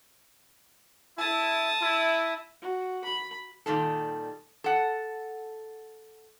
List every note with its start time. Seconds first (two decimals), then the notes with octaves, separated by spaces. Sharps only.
1.18 E4 A5 D#6
1.81 E4
2.62 F#4
3.04 B5
3.66 A#2 D#3 G3 A4
4.64 A4 F#5